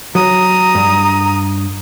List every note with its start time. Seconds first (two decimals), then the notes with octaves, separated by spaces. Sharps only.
0.15 F#3 A#5 D#6
0.75 G2